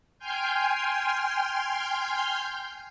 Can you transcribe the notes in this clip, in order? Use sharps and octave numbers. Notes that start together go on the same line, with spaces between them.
G5 G#5 C6 F6 G6